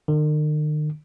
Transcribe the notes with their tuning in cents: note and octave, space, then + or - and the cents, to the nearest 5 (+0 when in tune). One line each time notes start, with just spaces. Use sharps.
D#3 -45